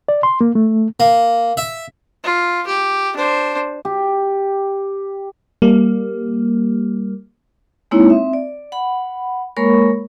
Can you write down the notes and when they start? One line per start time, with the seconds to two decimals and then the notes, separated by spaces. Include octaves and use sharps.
0.09 D5
0.23 C6
0.41 A#3
0.55 A3
1.00 A#3
1.57 E5
2.24 F4
2.66 G4
3.16 D4 C5
3.85 G4
5.62 G3 A#3
7.91 G#3 A#3 C4 D#4 E4 C#5
8.10 C4 E5
8.33 D5
8.72 F#5 B5
9.57 G#3 A#3 A#4 C#5 B5 C#6